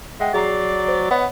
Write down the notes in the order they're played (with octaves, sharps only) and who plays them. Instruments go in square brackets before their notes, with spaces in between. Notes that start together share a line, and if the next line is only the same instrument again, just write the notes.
[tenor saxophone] G#3 [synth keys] E5 F#5 G5
[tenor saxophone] F#3 [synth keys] G#4 A#5 C7 [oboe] D5
[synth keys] C5
[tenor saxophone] B3 [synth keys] C#5 D#5 F#5